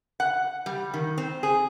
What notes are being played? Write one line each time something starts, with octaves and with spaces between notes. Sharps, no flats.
F#5
G3
D#3
C4
G#4